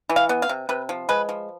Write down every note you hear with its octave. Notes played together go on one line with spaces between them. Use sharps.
E3
F5
B3
F5
C3
C3 B4
F3
G#3 B4
F3